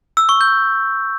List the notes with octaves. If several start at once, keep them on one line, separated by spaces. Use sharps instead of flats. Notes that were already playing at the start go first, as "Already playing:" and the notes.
E6
C#6
G6